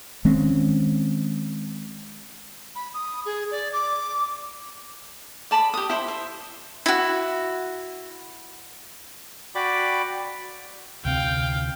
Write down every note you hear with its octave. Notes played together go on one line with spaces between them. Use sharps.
D#3 G#3 C4 C#4
B5
D#6
G#4
D5
D6
D5 A5 B5 D#6
G4 D#6
E4 C5 E5
C5 E5
E4 F#4
F#4 D5 G5 B5 D6
D2 C3 C4 F5 G5